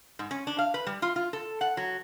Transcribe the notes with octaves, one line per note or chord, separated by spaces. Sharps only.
G#2
C#4
D4
F5
B4
G3
F4
F4
A4
F#5
F#3